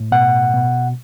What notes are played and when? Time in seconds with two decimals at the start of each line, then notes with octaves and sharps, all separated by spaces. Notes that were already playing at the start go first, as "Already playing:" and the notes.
Already playing: A2
0.12 B2 F#5
0.54 B2